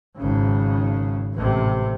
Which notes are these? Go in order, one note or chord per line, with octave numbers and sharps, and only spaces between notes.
G#1 C#3
A1 C3